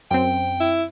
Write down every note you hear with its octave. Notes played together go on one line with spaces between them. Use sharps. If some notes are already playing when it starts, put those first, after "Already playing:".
F#2 C4 G5
E4